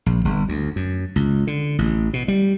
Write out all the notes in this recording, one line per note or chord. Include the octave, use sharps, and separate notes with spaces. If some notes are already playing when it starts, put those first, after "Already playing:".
A#1
G1
D2
F#2
C#2
D3
A1
B2
G3